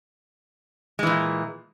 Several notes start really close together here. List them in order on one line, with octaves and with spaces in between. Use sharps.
G#3 E3 A#2